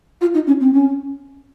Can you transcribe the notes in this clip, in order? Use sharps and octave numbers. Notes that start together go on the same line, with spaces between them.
F4
D#4
C#4
C4
C#4